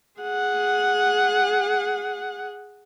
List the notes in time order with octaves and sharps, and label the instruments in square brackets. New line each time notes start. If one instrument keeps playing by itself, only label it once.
[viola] G#4 F#5